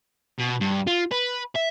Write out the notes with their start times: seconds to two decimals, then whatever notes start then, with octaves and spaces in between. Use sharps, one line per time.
0.38 B2
0.61 G2
0.87 F4
1.11 B4
1.55 E5